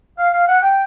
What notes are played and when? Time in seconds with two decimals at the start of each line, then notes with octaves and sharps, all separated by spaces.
0.18 F5
0.33 F5
0.47 F#5
0.62 G5